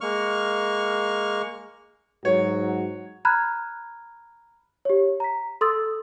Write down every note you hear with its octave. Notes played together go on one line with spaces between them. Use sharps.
G#3 A#3 C#6 F6
G#2 F#3 F#4 C#5
A#5 B5 F6 F#6 G#6
G4 C#5
A#5 B6
A4 C6 D#6 E6 A6